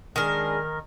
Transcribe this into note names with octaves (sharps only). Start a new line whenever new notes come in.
D#3 G#3 D4 G#4 A#4